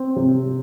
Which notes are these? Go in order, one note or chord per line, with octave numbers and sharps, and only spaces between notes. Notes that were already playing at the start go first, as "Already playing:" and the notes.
Already playing: C4
C3